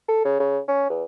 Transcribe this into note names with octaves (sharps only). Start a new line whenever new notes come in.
A4
C#3
C#3
C#4
E2